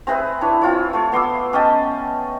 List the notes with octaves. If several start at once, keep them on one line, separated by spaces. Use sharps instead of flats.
C4 G#4 B4 E5
D4 E4 C#5
C4 F4 C#5
A3 C#5
B3 C6 D6 E6
C#4 D#5 G5 A5